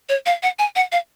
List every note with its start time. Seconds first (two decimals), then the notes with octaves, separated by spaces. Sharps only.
0.09 C#5
0.26 F5
0.43 F#5
0.59 G#5
0.76 F#5
0.92 F5